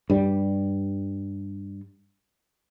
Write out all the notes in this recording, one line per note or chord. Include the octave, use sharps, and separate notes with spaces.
G2 G3